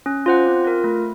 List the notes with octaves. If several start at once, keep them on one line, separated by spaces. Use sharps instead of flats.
C#4
F4 C5 F#5
C4
F4 A#4
A3